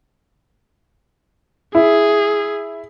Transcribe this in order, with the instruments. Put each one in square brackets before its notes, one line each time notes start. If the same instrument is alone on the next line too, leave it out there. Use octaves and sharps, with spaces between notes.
[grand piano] E4 [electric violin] G#4